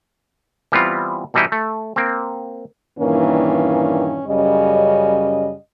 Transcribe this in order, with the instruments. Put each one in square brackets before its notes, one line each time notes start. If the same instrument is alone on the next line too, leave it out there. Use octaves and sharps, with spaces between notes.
[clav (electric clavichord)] E3 G3 B3 C4 F4
B2 E3 G3 D#4 E4 D#5
A3
A#3 C4
[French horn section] G2 A#2 D#3 E3 A#3 C#4
F#2 C#3 G3 D#5